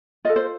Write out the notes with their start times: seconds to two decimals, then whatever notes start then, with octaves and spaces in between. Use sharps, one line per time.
0.25 F4 D#5
0.29 A4
0.36 C5